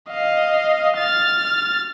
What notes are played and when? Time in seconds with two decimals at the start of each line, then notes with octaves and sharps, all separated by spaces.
0.11 D#5 F5
0.98 F6 A6